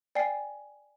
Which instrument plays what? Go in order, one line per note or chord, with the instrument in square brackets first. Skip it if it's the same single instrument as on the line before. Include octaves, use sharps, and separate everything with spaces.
[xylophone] D5 G5 G#5 C7